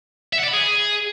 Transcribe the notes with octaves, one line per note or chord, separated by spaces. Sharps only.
E5
F#5
D5
B5
G#4